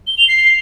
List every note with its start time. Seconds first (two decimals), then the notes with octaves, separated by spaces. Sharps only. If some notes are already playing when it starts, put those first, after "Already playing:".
0.07 G7
0.18 F7
0.28 C7